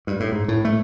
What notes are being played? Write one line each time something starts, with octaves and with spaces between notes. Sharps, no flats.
G2
A2
G#2
A2
A3